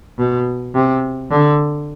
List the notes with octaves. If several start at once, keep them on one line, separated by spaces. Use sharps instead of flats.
B2
C3
D3